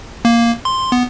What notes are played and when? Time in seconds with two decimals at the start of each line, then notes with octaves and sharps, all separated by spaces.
0.25 A#3
0.65 C6
0.92 B3